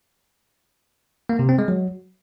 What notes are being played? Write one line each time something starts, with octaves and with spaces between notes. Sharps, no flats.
A#3
C3
C4
G#3
F#3